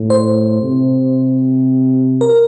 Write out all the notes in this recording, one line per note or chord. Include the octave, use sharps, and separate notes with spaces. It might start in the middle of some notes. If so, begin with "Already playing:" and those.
Already playing: A2
C5
C3
A#4